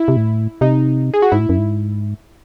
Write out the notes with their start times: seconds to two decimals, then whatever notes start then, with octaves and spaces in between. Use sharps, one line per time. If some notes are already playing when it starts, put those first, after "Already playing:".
Already playing: E4
0.08 C3
0.17 A2
0.61 C3 D#4
1.14 G#4
1.22 F#4
1.32 G#2 E4
1.40 A2
1.49 F#2
1.59 G#2